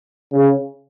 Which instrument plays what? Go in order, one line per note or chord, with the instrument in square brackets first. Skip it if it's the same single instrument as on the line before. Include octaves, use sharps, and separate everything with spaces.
[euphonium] C#3